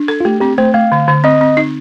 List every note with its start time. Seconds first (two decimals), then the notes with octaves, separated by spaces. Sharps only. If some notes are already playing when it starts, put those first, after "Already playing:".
Already playing: D4
0.08 A4
0.21 F4
0.25 A3 G4
0.41 C4 G4
0.58 A3 C5
0.74 A3 F5
0.92 D3
1.08 D3
1.24 C4 D#5
1.41 C4
1.57 D#4